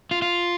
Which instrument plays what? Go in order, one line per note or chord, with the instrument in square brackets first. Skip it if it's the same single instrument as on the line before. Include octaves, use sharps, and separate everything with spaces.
[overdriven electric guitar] F4
F4